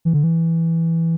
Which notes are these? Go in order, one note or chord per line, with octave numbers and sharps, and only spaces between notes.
E3
D3
E3